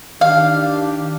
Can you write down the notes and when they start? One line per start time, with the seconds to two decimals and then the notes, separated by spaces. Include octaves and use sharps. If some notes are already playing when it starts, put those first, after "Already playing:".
0.21 D#3 D4 G4 F5